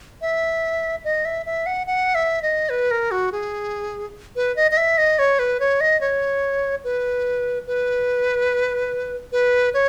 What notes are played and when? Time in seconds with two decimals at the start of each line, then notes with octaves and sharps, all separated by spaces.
0.21 E5
1.04 D#5
1.25 E5
1.46 E5
1.66 F#5
1.87 F#5
2.15 E5
2.42 D#5
2.69 B4
2.91 A#4
3.11 F#4
3.32 G#4
4.36 B4
4.56 D#5
4.71 D#5
4.77 E5
4.98 D#5
5.19 C#5
5.39 B4
5.60 C#5
5.80 D#5
6.01 C#5
6.84 B4
7.67 B4
9.32 B4
9.74 C#5